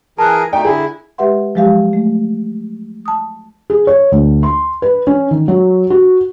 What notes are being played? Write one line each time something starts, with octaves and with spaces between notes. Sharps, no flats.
E3 G#4 A#4 A5 F#6
B2 A3 D#4 D5 G5 A#5
D3 E4 G#4 G#5
G#3 G4 B4 E5 F#5 C6
F3 F#3 G#3 G4 F5
A3
A5 D#6
G#4
C#5
D2
C6
B4
C#4
D#3
F#3
F#4